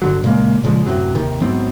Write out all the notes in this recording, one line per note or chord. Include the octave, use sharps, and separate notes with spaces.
G1 D3 F#3
A#2 C#3 G#3 A#3
A#2 C#3 F3 G#3
F#2 A2 C3 F#3
D#2 C3 D#3
G#2 F#3 B3 C4